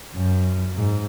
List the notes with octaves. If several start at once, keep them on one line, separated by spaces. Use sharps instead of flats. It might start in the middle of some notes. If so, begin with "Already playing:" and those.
F#2
G#2